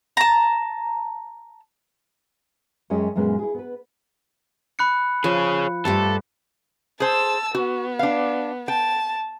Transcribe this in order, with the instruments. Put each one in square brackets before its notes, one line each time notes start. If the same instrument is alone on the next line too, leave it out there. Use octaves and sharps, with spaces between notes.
[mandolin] A5 A#5
[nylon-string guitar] F#2 G#3 C#4 C#5 D#5 G5
F#2 A#2 G#3 B3 C#4
E4 G#4
B3 B4
[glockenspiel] B5 F#6 C#7
[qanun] F3 [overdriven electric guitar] G#4 C#5
[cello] G2 [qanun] A3 G4 C5 [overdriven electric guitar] A4
[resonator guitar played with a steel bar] G#4 C5 [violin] A5 E6
[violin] B3 [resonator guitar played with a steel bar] F#4
[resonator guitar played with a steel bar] D4 F5
[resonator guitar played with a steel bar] G5 [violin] A5